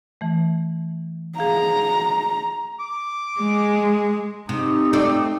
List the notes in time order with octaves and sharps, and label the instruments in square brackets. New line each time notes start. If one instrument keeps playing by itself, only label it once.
[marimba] E3 A3
[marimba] G#4 F5 [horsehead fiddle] A#5
[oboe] D6
[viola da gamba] G#3
[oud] C3 [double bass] D#4
[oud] A3 C4 D5